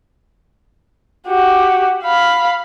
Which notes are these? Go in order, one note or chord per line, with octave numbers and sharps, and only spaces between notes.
F#4 G4
F5 B5